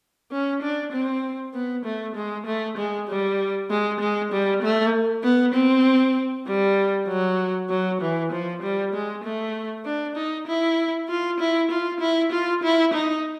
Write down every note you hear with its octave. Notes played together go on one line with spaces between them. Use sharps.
C#4
D4
C4
B3
A3
G#3
A3
G#3
G3
G#3
G#3
G3
A3
B3
C4
G3
F#3
F#3
E3
F3
G3
G#3
A3
D4
D#4
E4
F4
E4
F4
E4
F4
E4
D#4